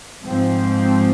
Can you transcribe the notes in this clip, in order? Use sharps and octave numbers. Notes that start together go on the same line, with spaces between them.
G#2 F3 C4